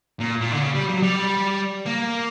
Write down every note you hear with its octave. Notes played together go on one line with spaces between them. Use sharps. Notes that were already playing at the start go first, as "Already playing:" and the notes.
A#2
A#2
D3
C#3
G3
F#3
G3
A#3